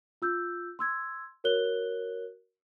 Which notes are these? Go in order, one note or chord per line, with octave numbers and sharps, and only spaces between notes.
F4 E6 G6
C6 E6 G#6
F#4 A#4 C#5 F#6 G7